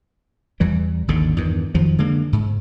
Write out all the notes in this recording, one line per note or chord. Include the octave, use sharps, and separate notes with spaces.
E2 E3 G3
G#1 D#2 D3
E2 G2 D#3
F2 D#3 F3 F#3
D3 G#3 A#3
G#2